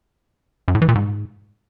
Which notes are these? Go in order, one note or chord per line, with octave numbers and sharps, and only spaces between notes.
F#2
A2
E3
A#2
G#2